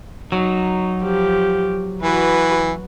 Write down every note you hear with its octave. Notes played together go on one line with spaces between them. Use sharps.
F#3 D#4
F3 G4
E3 F#4 B4